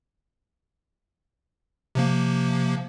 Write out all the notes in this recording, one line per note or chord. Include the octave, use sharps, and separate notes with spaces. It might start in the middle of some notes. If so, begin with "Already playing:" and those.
C3 F3 A#3